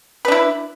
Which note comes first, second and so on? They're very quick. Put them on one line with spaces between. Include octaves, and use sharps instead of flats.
B4 D4 E4